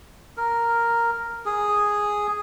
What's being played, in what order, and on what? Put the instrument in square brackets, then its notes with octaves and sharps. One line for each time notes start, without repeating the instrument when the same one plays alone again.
[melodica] A#4
G#4